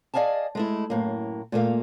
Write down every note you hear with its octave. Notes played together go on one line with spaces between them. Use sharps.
G#4 D5 D#5 F5 G#5 A5
G#3 A3 E4
F#2 A2 A#3
A#2 A3 A#3 F5